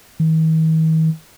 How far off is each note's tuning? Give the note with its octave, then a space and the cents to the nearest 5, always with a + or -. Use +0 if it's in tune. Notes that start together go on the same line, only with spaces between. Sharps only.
D#3 +45